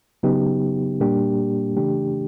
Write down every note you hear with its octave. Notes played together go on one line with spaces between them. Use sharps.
C#3 F#3 B3 D#4 G4
A#2 G3 A#3 D4 G4
C#3 E3 A3 D4 G4